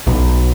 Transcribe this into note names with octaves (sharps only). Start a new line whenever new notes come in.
B1